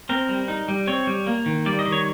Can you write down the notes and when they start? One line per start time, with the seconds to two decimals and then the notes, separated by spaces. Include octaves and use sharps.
0.09 C4 A#4
0.29 G3
0.48 D#4
0.68 G3
0.87 C4 C#5
1.07 G3
1.27 A#3
1.46 D#3
1.66 G3 D5
1.79 D#5
1.86 D#3
1.92 C#5